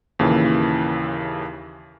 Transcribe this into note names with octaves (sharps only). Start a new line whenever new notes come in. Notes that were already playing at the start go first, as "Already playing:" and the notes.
D#2 A#2 C#3 E3